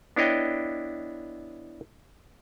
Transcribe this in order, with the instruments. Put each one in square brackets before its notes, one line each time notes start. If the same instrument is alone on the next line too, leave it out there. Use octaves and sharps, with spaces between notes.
[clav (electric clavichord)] B3 D4 E4 C#5 D#5 G5